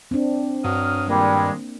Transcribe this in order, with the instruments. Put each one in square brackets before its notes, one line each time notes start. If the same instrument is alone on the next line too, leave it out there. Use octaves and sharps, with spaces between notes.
[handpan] C4 D4
[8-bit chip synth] G2 [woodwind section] F#3 D#6 F6
[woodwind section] A#2 D#3 G#3 [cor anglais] G3 [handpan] A#3